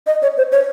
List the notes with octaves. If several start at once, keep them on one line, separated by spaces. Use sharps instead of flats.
D#5
C#5
C5
C#5